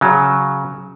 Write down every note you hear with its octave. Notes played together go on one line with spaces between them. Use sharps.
C#3 F#3